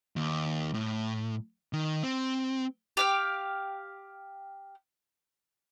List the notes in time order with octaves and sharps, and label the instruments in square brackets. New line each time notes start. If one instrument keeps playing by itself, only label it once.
[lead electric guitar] D#2
A2
D#3
C4
[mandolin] G4 F5 G5